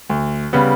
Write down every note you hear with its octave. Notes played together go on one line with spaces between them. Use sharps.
D2
C#3 G3 B3